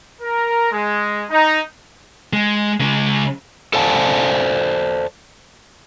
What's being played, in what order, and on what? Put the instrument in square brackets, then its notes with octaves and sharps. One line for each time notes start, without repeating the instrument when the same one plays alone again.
[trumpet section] A#4
G#3
D#4
[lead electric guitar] G#3
C#3 G#3
[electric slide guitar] A4 C5 D5 F5 G#5 A5